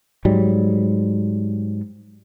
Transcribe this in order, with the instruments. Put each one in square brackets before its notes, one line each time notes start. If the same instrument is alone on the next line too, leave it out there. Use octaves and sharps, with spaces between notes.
[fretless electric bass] G#2 F#3 G3